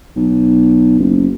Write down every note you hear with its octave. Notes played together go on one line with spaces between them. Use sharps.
B1
F#1